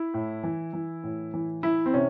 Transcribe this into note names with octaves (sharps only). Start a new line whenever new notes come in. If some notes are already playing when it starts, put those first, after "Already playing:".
Already playing: E4
A2
E3
E3
A2
E3
E3 E4
C4
C3 C#4